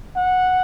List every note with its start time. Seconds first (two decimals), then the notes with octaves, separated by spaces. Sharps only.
0.16 F#5